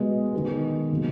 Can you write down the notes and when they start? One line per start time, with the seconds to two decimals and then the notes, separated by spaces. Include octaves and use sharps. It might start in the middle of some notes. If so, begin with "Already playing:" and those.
Already playing: B2 G#3 B3
0.33 D#3 G#3 B3
0.91 C3 D#3 F#3 A#3